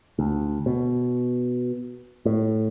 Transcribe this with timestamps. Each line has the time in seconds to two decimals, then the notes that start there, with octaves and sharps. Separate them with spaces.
0.19 D2
0.66 B2
2.25 A2